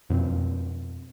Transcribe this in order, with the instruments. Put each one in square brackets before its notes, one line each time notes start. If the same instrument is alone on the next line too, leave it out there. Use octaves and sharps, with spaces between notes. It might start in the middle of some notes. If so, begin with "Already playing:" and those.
[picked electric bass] F2 B2 B3 C4